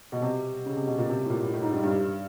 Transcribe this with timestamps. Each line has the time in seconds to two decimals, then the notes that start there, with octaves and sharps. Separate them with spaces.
0.12 B2
0.22 C3
0.66 C#3
0.76 C3
0.87 B2
0.98 A#2
1.09 C3
1.19 C3
1.25 A2
1.30 A#2
1.41 A2
1.54 A2
1.62 G#2
1.73 G2
1.83 G2